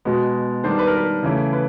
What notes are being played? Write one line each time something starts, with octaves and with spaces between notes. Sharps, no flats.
B2 G#3 B3
D#3 G3 B3 D4 C5
B4
A#4
B4
C#3 E3 A3
B4